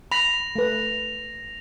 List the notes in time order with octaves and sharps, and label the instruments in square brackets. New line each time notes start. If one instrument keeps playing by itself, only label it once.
[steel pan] B5 [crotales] A#6 F7
[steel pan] A3 B4